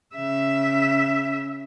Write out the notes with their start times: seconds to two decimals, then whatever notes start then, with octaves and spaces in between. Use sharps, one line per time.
0.15 C#3 E5